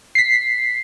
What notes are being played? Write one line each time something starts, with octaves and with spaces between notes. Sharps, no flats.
B6 C7